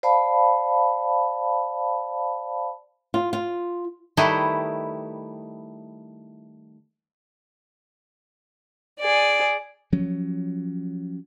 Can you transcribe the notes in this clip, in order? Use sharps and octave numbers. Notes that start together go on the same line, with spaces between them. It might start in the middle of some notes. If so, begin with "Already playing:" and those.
C5 D5 F5 A5 B5
F4
F4
D#3 G3 A3 E4 B4 D#5
G#4 D5
F3 F#3 C#4